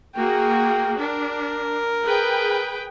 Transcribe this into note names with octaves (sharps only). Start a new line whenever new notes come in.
A#3 F#4 G#4 G5
D4 A#4
G#4 B4 G5